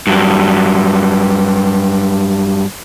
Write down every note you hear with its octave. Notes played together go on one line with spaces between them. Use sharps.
G2 F#3